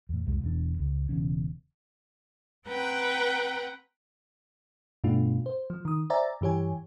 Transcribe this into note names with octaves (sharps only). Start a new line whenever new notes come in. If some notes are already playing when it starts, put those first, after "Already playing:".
E2 A2
C2 F2 G#3
E1 E2 D4
C#2
E1 E2 C#3 C#4
C4 B4 F#5 G5 A#5
G2 B2 A3 D4 F4
C5
F3
D#3 D#6
C5 D5 E5 G#5 A#5 A6
G2 E3 G4 C#5 G#5